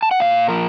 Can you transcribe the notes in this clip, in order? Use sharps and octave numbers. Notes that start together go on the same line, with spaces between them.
A5
F#5
A#2 F5
F3 A#4